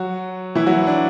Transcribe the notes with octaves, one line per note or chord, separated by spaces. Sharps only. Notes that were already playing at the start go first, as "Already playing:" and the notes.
Already playing: F#3 F#4
E3 E4
F#3 F#4
D4